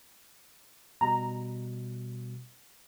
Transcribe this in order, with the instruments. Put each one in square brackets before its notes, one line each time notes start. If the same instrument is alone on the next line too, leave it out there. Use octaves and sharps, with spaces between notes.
[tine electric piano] B2 G3 [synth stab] A#5